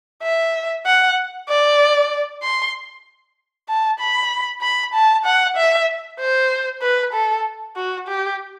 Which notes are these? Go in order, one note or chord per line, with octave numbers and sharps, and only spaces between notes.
E5
F#5
D5
C6
A5
B5
B5
A5
F#5
E5
C5
B4
A4
F#4
G4